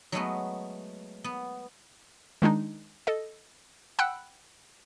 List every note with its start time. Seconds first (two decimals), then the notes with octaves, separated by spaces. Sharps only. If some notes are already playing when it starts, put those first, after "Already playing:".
0.12 F#3 G#3 A3 B3
1.24 B3
2.42 D#3 G#3 D4 D#4
3.07 A4 D#5
3.99 F#5 G5 B5 E6 F#6